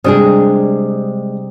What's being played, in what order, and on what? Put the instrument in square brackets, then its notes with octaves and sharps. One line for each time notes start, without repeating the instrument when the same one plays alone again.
[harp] C3 G3 D#6 [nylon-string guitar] G#3 D4 G#4